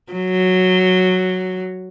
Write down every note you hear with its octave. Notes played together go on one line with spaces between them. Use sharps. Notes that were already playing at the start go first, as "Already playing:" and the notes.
F#3